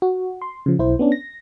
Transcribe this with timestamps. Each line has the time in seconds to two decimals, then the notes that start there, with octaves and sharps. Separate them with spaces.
0.02 F#4
0.42 C6
0.66 C#3 F3
0.79 B1 E4 C5
0.99 B3 C#4 D4
1.12 A#6